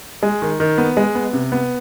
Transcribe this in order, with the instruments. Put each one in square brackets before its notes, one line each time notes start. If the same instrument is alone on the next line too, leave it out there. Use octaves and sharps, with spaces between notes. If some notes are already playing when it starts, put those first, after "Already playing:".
[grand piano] G#3
D#3
D#3
B3
G#3
B3
C3
B3